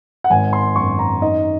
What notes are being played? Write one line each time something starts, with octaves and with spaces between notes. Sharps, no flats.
F#5
G#1 G#5
C6
F#2 C#6
A#5
D#3 D#5